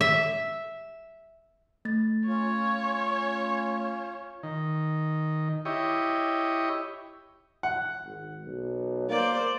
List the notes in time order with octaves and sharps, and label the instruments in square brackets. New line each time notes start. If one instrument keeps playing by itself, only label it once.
[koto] E5
[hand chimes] A3 A6
[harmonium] C#4 F4 [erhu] C#5
[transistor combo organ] D#3
E4 G4 C#5 D#5
[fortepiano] F#5
[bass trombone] G#1
B1
[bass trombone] A#3 [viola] C5 D5